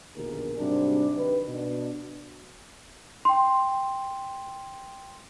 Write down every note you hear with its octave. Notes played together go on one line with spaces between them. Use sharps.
A#1 D#2 B2 D3 G#4 A#4
G#2 C3 F#3 G3 D4
D#3 B4
B2 D4
G5 C6